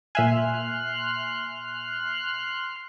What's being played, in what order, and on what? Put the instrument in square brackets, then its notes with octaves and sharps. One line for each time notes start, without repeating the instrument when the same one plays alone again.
[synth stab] A#2 E5 G#5 [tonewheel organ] C6 F6 F#6